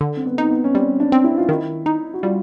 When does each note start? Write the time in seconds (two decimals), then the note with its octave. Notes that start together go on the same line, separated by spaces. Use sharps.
0.01 D3
0.17 C4
0.25 B3
0.38 C4 D#4
0.51 B3
0.64 C#4
0.75 G3 C4
1.00 D4
1.12 C4
1.24 E4
1.38 F4
1.49 D#3 E4
1.86 D#4
2.14 F#4
2.23 G3 F4